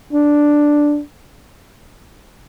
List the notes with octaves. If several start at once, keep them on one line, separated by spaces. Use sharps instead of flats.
D4